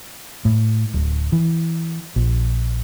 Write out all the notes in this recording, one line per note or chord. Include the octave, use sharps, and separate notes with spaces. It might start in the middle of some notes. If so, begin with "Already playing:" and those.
A2
D1
E3
A#1